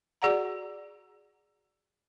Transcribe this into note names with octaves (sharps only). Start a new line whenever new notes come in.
F#4 G#4 D5 F#5 A#5